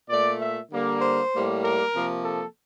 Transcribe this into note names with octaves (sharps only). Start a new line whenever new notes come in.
A#2 A3 D5
E5
D3 G3 A#3
C5
A2 G3 A#3
A#4
C3 F3 A#3
A4